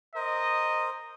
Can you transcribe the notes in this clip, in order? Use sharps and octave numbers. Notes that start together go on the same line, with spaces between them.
A#4 C5 D#5